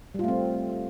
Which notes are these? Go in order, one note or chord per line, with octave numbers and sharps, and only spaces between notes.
G3 A3 C4 F4